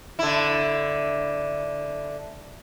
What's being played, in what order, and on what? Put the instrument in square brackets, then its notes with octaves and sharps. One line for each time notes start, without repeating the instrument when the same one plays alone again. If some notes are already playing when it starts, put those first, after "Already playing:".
[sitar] D3 E4